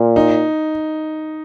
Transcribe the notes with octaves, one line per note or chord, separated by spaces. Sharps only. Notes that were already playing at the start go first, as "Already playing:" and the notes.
Already playing: A#2
D#4